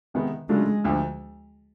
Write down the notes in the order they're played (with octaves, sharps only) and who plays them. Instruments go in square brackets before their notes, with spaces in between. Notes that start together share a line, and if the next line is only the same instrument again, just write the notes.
[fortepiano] C3 D#3 G#3 B3
[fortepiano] C#3 F#3 A3 D4 F4 [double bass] G#3
[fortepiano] D2 D3 F3